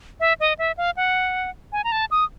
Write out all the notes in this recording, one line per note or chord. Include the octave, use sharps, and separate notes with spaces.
E5
D#5
E5
F5
F#5
G#5
A#5
A5
D#6